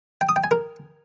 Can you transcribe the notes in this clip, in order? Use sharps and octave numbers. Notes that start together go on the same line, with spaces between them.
G5
D#6
G5
G#5
A#4